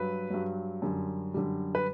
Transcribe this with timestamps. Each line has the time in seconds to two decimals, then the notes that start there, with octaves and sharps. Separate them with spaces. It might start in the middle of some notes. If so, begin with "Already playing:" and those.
Already playing: G2 F#3 B4
0.30 G2 F#3
0.82 F#2 D3 G3
1.34 F#2 D3 G3
1.75 B4